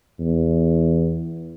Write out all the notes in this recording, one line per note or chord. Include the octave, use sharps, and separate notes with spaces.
E2